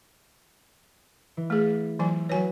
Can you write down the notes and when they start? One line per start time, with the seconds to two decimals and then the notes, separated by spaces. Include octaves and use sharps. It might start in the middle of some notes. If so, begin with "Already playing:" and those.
1.37 E3
1.50 A3 G#4 A6 B6
1.99 E3 F#3 G#5
2.29 F#3 F#4 B4 C#5 G#5